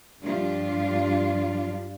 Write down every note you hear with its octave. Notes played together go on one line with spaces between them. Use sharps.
G2 F3 G3 D4 F4